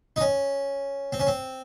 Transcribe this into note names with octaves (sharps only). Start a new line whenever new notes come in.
D#4
C#4
C4
C#4
C4